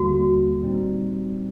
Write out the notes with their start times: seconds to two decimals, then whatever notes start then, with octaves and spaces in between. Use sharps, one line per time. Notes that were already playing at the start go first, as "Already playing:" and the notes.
Already playing: D#2 D3 G3 A#3 F#4
0.63 A#2 G3 C4 D#4